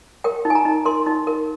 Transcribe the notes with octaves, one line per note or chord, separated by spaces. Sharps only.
A#4 G5
D#4
G#5
A#5
D#4
A#4 C6
D#4
A#4